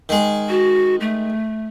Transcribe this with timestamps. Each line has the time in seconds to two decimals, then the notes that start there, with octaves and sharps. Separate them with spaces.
0.09 D#3 G#3
0.49 F#4
1.01 A3